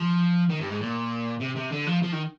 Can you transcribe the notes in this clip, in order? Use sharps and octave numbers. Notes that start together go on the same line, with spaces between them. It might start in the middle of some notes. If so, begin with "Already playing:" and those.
Already playing: F3
D#3
G2
G#2
A#2
C3
C3
D3
F3
F3
D#3